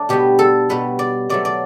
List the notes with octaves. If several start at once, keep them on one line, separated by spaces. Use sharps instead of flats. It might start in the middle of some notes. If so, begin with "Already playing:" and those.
Already playing: A3 D4
B2 G3 B3 G4
A4
B2 G3 B3 B4
D5
B2 F#3 A3 D5
D5